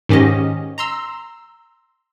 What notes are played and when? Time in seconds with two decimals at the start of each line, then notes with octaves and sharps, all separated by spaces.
0.09 G#2 D#3 C#4 G4 D#5
0.78 A#5 C6 E6